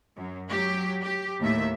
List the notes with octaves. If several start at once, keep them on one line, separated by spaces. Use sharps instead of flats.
F#2
F#3 G4
G4
D#2 A2 E5